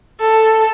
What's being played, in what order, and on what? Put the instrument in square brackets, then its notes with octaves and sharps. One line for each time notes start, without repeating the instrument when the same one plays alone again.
[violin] A4